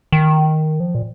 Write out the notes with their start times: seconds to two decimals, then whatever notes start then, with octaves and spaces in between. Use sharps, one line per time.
0.12 D#3
0.80 F3
0.95 A#2